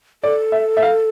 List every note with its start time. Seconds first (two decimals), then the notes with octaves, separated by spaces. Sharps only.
0.24 A4 D5
0.52 E5
0.77 E5
0.82 F5